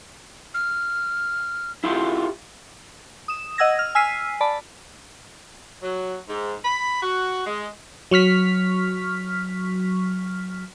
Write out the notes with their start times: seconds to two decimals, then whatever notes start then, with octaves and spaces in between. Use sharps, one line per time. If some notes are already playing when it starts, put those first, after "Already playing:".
0.54 F6
1.84 E4 F4 G4
3.28 D#6 E7
3.58 D#5 F#5 E6 G#6 A#6
3.79 F6
3.95 G#5 E6 F6 B6 C7 D#7
4.41 D5 A5 B5
5.82 F#3
6.29 G#2
6.64 B5
7.02 F#4
7.46 G#3
8.11 F#3 C#6 F6 B6